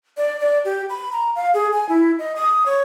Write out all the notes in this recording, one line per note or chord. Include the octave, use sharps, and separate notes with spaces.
D5
D5
G4
B5
A#5
F5
G#4
G#5
E4
D#5
D#6
C#5